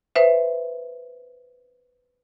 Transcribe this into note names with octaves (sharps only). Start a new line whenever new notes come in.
B4 C5 E5